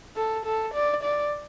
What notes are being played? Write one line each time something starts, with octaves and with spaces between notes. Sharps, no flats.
A4
A4
D5
D5